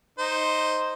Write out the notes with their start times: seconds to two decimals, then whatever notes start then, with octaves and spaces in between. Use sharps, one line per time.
0.19 D#4 C5